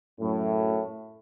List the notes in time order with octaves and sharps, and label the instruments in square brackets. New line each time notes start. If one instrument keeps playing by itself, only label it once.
[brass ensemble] F#2 A2